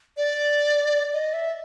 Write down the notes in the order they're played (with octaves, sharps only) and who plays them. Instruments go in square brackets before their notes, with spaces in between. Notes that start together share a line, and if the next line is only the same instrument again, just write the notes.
[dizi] D5
D#5
E5